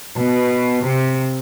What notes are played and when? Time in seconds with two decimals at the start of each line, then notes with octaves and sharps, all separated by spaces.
0.20 B2
0.85 C3